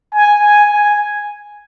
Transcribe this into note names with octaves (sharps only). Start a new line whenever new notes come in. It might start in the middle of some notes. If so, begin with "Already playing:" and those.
G#5
G#5
G#5